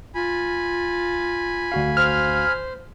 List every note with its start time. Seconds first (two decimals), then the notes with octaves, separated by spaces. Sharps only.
0.15 F4 G#5 B5
1.72 D2 F#4 F5
1.97 C5 F6